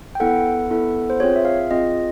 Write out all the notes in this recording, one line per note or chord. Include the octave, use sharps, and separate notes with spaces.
G5
B3 E4 A4 F#5
B3 E4 A4
C5
C4 F4 G#4 C#5
E5
F5
C4 F4 G#4 D#5